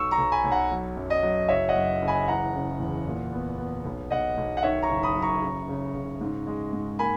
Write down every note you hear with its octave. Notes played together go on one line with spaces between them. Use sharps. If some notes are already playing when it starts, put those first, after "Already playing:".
Already playing: B1 C#6 E6
A#5 C#6
B1
G#5 B5
B1
F#5 A#5
F#3
F#2
D#5
F#3
F#1 C#5 E5
D#5 F#5
F#2
F#1
G#5 B5
E3 F#5 A#5
C#3
E2
A#2
B3
B3
B1
B1 D#5 F#5
B1
F#5
D#3 C#5 E5
A#5 C#6
F#1
B5 D#6
F#2
A#5 C#6
C#3
C#3
C#3
G#2
G#3
G#2
A#3 G#5 B5